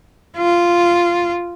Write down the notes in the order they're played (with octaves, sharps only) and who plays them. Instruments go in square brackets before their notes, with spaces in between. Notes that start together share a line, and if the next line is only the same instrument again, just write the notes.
[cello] F4